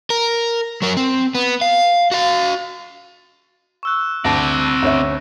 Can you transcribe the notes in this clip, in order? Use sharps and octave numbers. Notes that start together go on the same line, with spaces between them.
A#4
F#3 A#4
C4
B3
F5
F#4 F5
C#6 E6 F#6
D2 C4 D5 A5 A#6
D2 C#4 E5